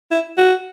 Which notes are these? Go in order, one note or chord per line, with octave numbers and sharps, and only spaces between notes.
E4
F#4